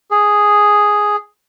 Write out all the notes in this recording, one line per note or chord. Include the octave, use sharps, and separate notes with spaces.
G#4